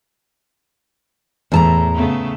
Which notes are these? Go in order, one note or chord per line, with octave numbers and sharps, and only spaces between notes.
E2 A2 A5 A#5
C#3 A3 B3